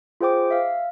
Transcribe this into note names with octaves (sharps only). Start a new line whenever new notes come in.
F4 G#4 C5 G5 D6
E5 F5